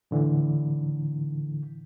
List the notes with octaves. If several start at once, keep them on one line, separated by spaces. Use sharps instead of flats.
A2 D3 E3